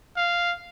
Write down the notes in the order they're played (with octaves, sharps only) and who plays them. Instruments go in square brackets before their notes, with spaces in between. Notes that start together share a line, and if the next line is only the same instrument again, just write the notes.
[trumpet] F5